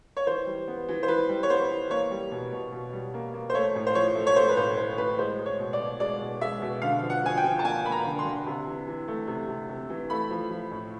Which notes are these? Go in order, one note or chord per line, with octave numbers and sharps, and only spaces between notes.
C#5
E3 C5
G3
B3
E3
C5
E3 B4
G3
C#5
B3 C5
E3
A#3 C#5
G3
B2
B2
B2
G3
A#3
A#3
C5
A3 C#5
A2
C5
F3 C#5
A3
C#5
A3 C5
B4
A2 C5
A2 C5
A2 B4
G#3 C5
G#3
C#5
B2
D5
B2
G#3 D5
B2
G#3 E5
B2
D3 F5
F3
F#5
F3 G#5
G5
F3
A5
A#3 G#5
A#3 B5
A#5
D3
C6
D3
C3
E3
E3
A3
C3
C3
C3
E3
A3 B5
F3
F3
A2